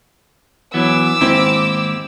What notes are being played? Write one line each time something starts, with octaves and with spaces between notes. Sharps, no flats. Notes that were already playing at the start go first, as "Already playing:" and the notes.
E3 F#3 B3 D6 E6
D#2 G#2 C4 E4 G4